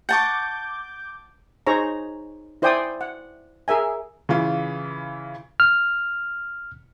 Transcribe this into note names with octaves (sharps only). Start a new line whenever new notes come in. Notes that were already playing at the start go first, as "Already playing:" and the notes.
F#5 A5 C#6 D6 G6
D#4 G#4 C5 C#5 A#5
E4 C5 D5 G5 G#5 D#6
F#5
G#4 A#4 E5 G#5
C#3 E3 F4
F6